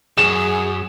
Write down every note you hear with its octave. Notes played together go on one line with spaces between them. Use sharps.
F#2 G#4 E7